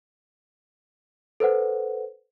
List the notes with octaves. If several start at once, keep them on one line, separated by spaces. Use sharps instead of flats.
A4 B4 C5 F#5